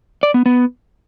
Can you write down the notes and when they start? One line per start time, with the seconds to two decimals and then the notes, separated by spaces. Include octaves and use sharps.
0.23 D5
0.34 B3
0.46 B3